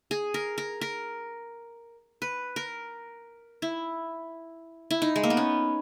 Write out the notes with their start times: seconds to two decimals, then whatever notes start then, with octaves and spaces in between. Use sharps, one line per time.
0.11 G#4
0.34 A#4
0.58 A#4
0.81 A#4
2.22 B4
2.56 A#4
3.62 E4
4.91 E4
5.02 D#4
5.16 G#3
5.23 A#3
5.30 B3
5.37 C#4